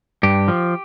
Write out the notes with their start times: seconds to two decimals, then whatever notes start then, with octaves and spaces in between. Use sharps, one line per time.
0.23 G2 G4
0.48 F3